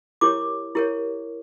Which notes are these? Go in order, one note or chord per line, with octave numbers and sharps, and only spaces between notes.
E4 G4 A#4 C#5 D6
E4 G4 A#4 C#5